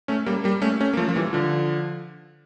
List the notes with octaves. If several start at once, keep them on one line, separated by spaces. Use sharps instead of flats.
A3 C#4
G3 A#3
G3 A#3
A3 C#4
A3 C#4
A#3
F3 A3
F3
E3 G3
D3 F3